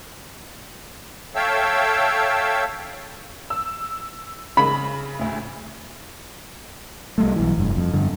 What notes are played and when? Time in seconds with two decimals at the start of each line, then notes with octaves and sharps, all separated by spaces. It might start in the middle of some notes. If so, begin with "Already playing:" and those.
1.35 A4 C#5 E5 F5 G5 E6
3.50 E6
4.57 C#3 B5
5.19 D2 A2
7.18 C2 G3 A3
7.36 B1 E3
7.58 F1 G2
7.77 F2
7.94 G2 D3